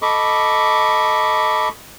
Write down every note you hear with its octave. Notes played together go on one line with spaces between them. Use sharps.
A4 D#5 B5 C#6 D6